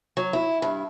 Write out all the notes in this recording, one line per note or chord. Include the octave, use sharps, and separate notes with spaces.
F#3
E4
G2